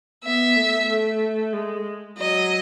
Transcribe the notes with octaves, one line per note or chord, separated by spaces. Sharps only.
B3 E5
A3
A3
G#3
F#3 D#5